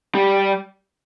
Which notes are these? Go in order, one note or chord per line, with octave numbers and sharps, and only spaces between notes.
G3